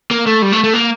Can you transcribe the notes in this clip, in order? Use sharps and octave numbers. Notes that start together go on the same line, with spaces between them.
A#3
A3
G3
A3
A3
A#3